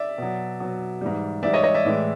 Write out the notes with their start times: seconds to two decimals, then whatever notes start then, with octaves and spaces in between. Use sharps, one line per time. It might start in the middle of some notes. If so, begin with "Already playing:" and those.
Already playing: D5 E5
0.18 B2 F#3
0.60 B2 F#3
1.01 G#2 E3 G3
1.43 G#2 E3 G3 D5 E5
1.53 C#5 D#5
1.64 C#5 D#5
1.74 D5 E5
1.85 A2 E3 G#3